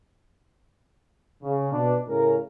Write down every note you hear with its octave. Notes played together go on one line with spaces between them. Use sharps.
C#3
B2 D4
A2 C#3 C#4 A#4